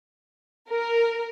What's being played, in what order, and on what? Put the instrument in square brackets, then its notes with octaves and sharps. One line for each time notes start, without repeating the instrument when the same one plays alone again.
[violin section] A#4